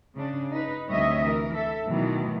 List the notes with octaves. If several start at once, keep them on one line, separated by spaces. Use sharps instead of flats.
C#3 D4
D#4 B4
D2 C3 G3 C#5 D#5 E5
E3 A#4
A4 E5
B2 D#3 E3 F#3 A3